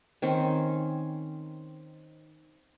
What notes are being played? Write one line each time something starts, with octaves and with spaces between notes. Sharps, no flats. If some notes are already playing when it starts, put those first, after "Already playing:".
D#3 C4 C#4